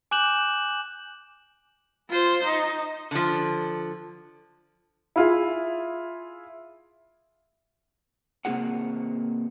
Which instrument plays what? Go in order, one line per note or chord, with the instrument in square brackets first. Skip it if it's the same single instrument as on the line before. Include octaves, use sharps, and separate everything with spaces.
[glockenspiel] G#5 D6 F#6 G6 E7 F#7
[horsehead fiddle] F4 C5
D#4
[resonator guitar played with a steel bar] D3 F3
[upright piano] E4 F4 G#4
[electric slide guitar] C3 A#3 C4 F4 G#4 F#5